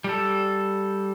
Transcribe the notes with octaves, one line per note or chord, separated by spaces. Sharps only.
G3 A4